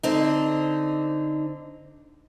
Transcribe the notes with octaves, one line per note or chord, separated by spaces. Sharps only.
D3 C4 D#4